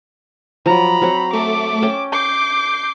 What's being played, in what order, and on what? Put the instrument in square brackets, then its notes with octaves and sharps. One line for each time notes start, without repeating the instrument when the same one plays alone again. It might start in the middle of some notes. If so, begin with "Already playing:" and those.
[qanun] F3 F#3 [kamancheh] A#5 B5
[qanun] F#3 C4 F#5
[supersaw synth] A3 [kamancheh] D6
[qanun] C#4 G5 A5
[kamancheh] D6 [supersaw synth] G6 C7